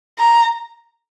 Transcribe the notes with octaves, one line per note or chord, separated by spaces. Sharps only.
A#5